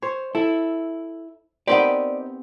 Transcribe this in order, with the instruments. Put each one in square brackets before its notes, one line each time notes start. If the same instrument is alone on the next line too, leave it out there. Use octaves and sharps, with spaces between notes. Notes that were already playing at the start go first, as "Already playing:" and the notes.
[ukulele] C5 [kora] C#5
[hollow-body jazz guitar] E4 [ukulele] A4
[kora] B3 C4 G4 [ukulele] D#4 A#4 C5 [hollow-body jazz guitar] D5